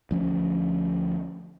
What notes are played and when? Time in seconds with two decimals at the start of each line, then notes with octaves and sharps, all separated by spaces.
0.11 D2 F3 C#4